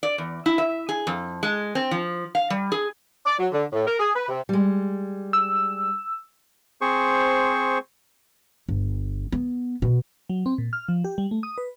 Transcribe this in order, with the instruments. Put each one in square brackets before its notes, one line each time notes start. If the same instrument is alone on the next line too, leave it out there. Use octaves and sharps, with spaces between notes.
[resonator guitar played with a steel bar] D5
E2
E4
E5
G#4
F2
G#3
C4
F3
F5
G3
G#4
[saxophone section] D5
F#3
D3
A2
A#4
G#4
B4
C3
[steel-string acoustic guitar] G3 G#3
[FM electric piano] E6
[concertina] C4 G#4 C5 C#6
[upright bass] G1
B3
B2
[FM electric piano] F#3
C4
A#2
F6
F3
G4
G3
A3
D#6
B4